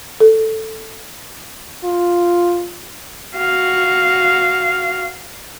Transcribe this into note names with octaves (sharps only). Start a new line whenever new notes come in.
A4
F4
F#4 F5